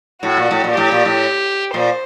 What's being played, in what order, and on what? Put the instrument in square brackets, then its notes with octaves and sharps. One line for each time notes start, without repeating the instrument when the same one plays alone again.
[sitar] A2 [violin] F#4
[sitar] A#2
A2
A#2
[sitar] A2 [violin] G4
[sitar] A#2
A2
[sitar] A#2 [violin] C5